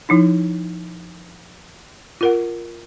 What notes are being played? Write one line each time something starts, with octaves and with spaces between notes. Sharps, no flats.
F3 D#4 E4
F4 A#4 F#5